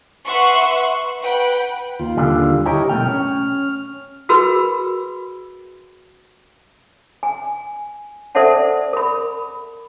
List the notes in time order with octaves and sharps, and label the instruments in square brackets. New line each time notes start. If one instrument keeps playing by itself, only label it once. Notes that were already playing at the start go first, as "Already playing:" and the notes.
[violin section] B4 E5 F#5 C6 C#6
B4 F#5 G5 B5
[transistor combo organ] D#2 F4
[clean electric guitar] D3 G3
[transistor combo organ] E4 C#5 D#5 [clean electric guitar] G4 A#4
[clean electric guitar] B1 A3 G5 [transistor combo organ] F6
[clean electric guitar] C#4 C#5
[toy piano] F#4 G#4 A#4 B4 B5 E6
G#5
A4 C5 D5 E5 F#5 A5
A#4 B5